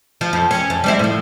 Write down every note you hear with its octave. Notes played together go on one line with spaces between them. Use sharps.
F3
F2
C#4
F2
G3 C4 E4
A2 F3